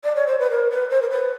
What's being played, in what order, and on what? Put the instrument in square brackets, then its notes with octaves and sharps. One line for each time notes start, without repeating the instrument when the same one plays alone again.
[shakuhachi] D5
C#5
C5
B4
A#4
B4
C5
A#4
B4